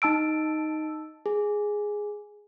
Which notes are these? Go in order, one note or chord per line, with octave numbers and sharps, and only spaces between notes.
D#4 A5 E6 D7
G#4